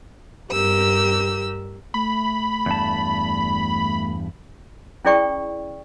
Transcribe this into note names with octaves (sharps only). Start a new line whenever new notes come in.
G2 G4 A#4 E6
A3 B5
E2 G2 A5
C#4 E4 G#4 D5 G5 C#6